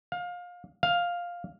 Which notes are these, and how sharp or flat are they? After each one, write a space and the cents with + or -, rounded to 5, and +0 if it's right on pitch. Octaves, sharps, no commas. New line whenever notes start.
F5 +25
F5 +5